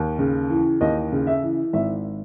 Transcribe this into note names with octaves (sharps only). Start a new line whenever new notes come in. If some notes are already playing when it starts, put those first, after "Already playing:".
Already playing: D#2
C#3
E3
D#2 D#5
C#3
E5
E3
G#1 E5